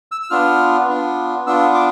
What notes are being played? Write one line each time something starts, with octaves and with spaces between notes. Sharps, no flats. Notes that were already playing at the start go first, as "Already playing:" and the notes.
E6
E6
B3 D4 F4 F6
B3 D4 F4
B3 D4 F4 E6
D6